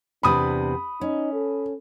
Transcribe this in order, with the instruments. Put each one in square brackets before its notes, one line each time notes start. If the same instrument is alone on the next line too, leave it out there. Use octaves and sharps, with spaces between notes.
[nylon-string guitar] E2 C3 B4 [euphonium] D4 [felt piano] B5 D#6
[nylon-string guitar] C#4 [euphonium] D#4
[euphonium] A4